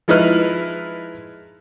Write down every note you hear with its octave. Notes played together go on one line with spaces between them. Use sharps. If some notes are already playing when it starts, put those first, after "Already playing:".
F3 G#3 D#4 E4 B4 F6